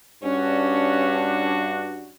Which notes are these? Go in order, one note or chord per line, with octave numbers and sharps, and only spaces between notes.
G2 C#4 D4 F#4